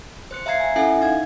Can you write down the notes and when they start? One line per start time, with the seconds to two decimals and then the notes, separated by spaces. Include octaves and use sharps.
0.31 C5 F#6 C#7
0.46 E5 F5 A#5 G#6 C7
0.60 G#5
0.76 C#4 E4 A4 E5 F#5 G#5
1.01 D#4 F5 G#6